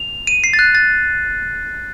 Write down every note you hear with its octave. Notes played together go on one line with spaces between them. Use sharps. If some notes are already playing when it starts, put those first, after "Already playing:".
Already playing: F7
D#7
C7
A6
F#6
A6